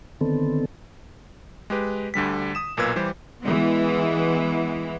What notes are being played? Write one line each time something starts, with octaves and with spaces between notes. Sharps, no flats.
D3 D#3 B3 C4 A4
G#3 G4 B4
D2 D3 G3 B6
D#6 E7
B1 A#2 A#4 B4 E6 G#6
E3 G3 G4 C5
E3 G#3 B3